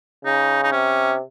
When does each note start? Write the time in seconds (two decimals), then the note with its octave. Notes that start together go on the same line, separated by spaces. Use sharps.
0.25 C#3 D#4
0.63 D#4
0.72 C3 C#4